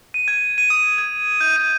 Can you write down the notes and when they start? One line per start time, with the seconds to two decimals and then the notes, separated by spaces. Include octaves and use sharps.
0.14 D#7
0.28 G#6
0.58 D#7
0.70 D#6
0.98 G#6
1.41 G6
1.56 D#7